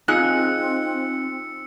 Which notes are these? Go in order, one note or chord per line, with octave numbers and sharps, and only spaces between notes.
C4 D#4 F4 G#4 E6 F#6 C#7